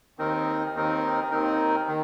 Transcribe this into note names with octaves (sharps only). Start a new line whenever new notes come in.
D#2 D#3 C4 D#4 A#4
D#2 D#3 C4 D#4 A#4
D#2 D#3 C4 D#4 A#4
D#3